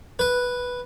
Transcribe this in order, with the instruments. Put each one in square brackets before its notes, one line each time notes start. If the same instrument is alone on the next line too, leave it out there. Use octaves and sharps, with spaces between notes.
[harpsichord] B4